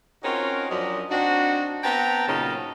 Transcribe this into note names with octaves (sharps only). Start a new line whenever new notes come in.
C4 C#4 D#4 F4 F#4 A#4
F#2 F3 F#3 D4 D#5
C4 D4 D#4 F#4
B3 C4 G5 A5 A#5
F#2 A#2 C#3 D#4 A#4 A5